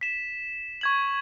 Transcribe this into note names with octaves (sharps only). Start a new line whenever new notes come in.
B6 E7
C#6 G#6 F#7